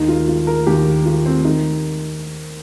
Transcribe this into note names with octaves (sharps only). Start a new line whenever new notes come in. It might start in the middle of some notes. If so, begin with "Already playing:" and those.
Already playing: D#2 D#3 D#4
F4
F4
A#4
D#2 D#3 G4
F4
C4
D#3 D#4